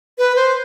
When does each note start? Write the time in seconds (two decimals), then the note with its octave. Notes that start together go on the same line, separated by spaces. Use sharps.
0.18 B4
0.36 C5